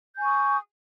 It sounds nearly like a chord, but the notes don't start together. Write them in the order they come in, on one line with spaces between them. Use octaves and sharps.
G6 G#5 C#6 D#6